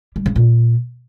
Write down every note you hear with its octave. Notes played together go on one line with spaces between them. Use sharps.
G3
C#3
A#2